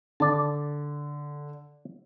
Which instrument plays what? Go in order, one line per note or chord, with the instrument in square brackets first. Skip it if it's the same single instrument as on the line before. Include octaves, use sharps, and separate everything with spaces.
[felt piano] D3 [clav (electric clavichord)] D5 A5